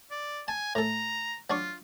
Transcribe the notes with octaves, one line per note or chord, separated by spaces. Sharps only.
D5
G#5 A5
A2 A4 A#5
F#3 D4 F4 C#6